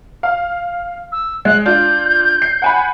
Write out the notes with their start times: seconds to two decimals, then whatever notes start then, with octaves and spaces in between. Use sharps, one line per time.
0.23 F5
1.12 E6
1.45 G#3 F#6
1.66 D4 F4 G6
2.42 C7
2.62 F#5 G#5 B5